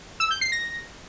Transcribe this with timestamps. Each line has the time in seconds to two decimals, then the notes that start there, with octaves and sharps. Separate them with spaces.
0.20 E6
0.31 G6
0.41 C7
0.52 A#6